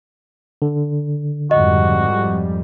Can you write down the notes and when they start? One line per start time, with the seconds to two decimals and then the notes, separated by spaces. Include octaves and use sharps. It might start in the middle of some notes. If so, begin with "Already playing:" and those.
0.62 D3
1.51 F2 G#2 G3 F#4 D#5